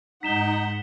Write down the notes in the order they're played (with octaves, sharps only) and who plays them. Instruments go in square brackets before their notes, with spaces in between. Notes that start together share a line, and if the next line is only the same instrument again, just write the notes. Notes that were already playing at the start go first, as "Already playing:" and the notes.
[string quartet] G#2 F#5 [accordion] D#4 [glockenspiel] B6 E7 G7